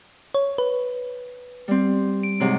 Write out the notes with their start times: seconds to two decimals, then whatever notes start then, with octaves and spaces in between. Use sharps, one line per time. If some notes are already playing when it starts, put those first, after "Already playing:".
0.34 C#5
0.58 B4
1.68 G3 C4
2.23 D7
2.40 G#2 C3 F#3